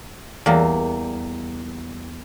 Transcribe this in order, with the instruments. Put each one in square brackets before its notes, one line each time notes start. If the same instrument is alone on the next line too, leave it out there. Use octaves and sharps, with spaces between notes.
[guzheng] E2 G3 A#3